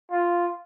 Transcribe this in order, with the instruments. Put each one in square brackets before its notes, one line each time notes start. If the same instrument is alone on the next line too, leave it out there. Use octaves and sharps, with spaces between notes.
[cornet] F4